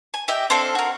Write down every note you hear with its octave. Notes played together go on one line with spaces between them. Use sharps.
G#5
G4 D#5 E5 G5
C4 D4 A4 F5
F#4 A#4